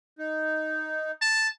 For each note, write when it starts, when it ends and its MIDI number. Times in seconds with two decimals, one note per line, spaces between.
0.19 1.11 63
1.22 1.48 81